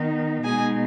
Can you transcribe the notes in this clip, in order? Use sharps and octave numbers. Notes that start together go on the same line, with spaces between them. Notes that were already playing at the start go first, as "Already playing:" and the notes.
Already playing: D#3 B3 D#4
B2 G#3 D#4 G#4 G#5